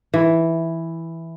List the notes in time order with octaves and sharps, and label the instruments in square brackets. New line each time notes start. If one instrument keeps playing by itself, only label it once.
[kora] E3